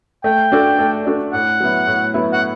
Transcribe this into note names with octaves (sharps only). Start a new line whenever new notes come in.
A3 G5
D4 F#4 A4 D5
A3
D4 F#4 A4 D5
A2 F#5
F#3 B3 E4
A2
F#3 B3 E4
F#5